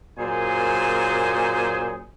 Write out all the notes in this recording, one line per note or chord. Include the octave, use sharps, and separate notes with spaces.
F#2 A#2 G#4 C5 G#5